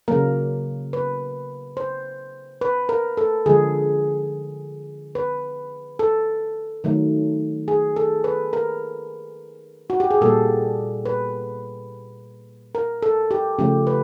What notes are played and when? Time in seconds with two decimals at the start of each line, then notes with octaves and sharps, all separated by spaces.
0.08 C#3 F#3 A#3 A#4
0.93 B4
1.77 C5
2.61 B4
2.89 A#4
3.17 A4
3.46 D3 F3 G#3 G#4
5.15 B4
5.99 A4
6.84 D#3 F#3 A3
7.68 G#4
7.96 A4
8.24 B4
8.53 A#4
9.90 F#4
10.00 G4
10.11 G#4
10.21 A#2 G3 A#3 A4
11.05 B4
12.75 A#4
13.03 A4
13.31 G4
13.59 C#3 F3 A3 G4
13.87 B4